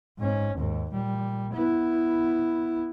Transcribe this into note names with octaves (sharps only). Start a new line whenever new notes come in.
G#2 C#4
D#2 G#2
A#2 G3
B3 E4